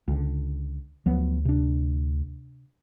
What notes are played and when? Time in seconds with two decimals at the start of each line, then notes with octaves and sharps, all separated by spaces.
0.08 C#2 D3
1.06 D2 F3 F#3 B3
1.45 C3 D4